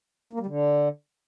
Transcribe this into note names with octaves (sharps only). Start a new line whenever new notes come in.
A#3
G3
D3